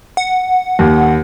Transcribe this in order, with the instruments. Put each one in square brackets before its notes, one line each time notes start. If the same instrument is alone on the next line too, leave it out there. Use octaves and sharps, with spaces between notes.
[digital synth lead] F#5
[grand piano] D#2